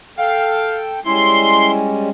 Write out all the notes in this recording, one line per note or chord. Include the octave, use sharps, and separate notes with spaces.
A4 F5 G5
G3 G#3 C#4 E4 C6